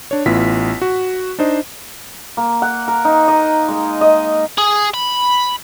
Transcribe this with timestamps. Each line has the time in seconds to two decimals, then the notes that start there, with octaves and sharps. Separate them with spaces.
0.11 D4 C#5
0.26 A1 B3 E4 F4 B6
0.82 F#4
1.39 D4 D#4 C5 D#5
2.37 A#3
2.62 F#5
2.88 A#4
3.05 D#4
3.28 D#5
3.68 G#3
4.01 D#5
4.58 G#4
4.94 B5